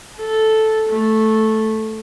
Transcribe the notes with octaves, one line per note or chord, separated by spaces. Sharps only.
A4
A3